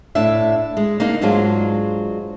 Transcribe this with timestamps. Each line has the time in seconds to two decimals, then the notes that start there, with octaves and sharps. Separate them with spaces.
0.15 A2 D4 E5
0.77 G#3
1.00 A#3 D4 D#4
1.21 G#2 F#3 G#3 D4 F4